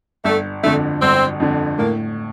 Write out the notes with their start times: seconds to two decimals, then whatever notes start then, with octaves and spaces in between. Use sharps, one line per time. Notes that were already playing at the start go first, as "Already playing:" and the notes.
0.24 G1 A3
0.63 F2 D3 A3
1.01 G1 C4
1.40 F2 D3
1.79 A2 A#3